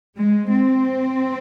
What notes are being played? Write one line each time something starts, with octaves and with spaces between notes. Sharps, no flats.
G#3
C4